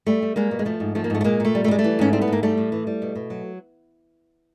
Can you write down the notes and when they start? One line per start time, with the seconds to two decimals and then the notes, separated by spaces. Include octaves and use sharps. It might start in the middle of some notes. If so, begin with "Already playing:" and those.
0.06 G3 A3
0.22 G3
0.36 G3 G#3 A#3
0.51 B2
0.59 G#3
0.65 F3 A3
0.80 G#2
0.95 F3 A3
1.04 A#3
1.10 G#2 A3
1.21 A3
1.24 A#2 G#3 A#3
1.40 A#2 A3
1.55 G3
1.64 A3
1.68 G3 G#3
1.79 A3
1.84 E3
1.99 G#2 C#4
2.13 G3 C4
2.22 B3
2.28 G#2 A#3
2.43 G3 A3
2.58 A2
2.72 E3
2.87 G3
3.02 B2
3.15 B2
3.30 F#3